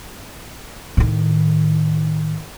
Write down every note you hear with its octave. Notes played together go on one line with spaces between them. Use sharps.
A2 D#3